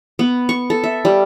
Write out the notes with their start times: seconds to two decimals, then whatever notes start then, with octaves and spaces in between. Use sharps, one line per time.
0.19 B3
0.49 C#6
0.70 A4
0.83 E5
1.05 G3